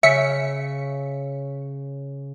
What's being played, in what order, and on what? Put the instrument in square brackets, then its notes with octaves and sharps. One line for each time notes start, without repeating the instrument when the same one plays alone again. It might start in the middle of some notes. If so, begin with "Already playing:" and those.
[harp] C#3 [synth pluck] E5 B6 C#7